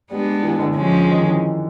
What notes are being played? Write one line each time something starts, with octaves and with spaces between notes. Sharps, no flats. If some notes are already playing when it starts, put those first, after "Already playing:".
G3 G#3 B3 D4
E3
D3
F3 G#3 C#4
D#3
E3